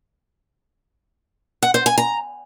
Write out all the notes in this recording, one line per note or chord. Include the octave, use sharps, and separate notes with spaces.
F#5
C5
G#5
A#5